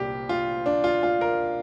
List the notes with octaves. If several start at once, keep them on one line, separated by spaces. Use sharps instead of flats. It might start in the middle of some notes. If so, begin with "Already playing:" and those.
Already playing: C2 A#2 G3 G4
F4
D4
F4
F4
A#4